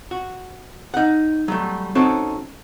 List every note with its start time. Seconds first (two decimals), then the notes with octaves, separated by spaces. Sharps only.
0.11 F#4
0.94 D#4 F#5
1.48 F#3 G3 A3
1.95 C4 C#4 D#4 F#4 A4